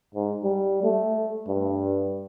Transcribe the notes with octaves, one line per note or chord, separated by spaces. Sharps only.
G#2
G3
A3
G2